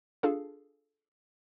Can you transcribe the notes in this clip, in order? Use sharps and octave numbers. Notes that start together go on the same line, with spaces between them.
D4 F4 G#4 A4 F5